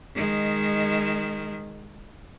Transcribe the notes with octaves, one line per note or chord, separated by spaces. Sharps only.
D#3 G#3